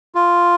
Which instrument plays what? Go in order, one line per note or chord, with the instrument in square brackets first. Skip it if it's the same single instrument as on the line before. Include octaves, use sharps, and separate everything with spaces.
[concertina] F4